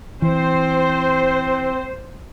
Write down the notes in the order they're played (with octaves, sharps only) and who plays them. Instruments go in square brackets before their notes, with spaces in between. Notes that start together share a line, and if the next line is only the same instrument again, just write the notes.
[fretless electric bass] E3 [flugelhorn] C4 [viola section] C5